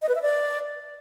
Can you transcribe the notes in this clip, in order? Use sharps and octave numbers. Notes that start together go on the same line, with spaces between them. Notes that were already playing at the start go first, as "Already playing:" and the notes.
D#5
B4
E5
D5